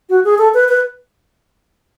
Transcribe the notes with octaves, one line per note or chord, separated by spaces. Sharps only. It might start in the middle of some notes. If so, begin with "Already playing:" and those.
F#4
G#4
A4
B4
B4